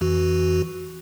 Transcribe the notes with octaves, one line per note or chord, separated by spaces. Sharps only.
F2 E3 F#4